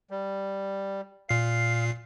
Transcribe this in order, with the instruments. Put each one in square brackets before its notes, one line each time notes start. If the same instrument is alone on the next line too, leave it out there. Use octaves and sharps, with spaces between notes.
[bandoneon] G3
[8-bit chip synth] A#2 C7 [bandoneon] F5